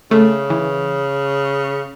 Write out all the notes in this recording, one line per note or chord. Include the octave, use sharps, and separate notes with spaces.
C#3 A3
E3